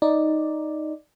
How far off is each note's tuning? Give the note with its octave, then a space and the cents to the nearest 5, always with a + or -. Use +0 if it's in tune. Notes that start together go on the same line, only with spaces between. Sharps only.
D#4 +0 D5 +0